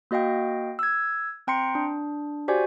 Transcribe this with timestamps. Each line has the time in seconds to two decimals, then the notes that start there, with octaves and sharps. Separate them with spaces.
0.11 A#3 F#4 D#5 F5 G5
0.79 E6 G#6
1.47 C4 G5 A#5 C6 C#7
1.75 D4
2.48 F#4 G4 C5 D5 G#5